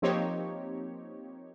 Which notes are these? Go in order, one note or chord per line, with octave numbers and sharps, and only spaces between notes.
F3 A#3 C4 D#4 G4 C#5